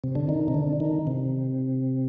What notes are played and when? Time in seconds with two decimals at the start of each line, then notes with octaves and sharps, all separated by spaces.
0.04 C3
0.15 D3
0.29 D#3
0.48 C3
0.54 D3
0.80 D#3
1.07 C3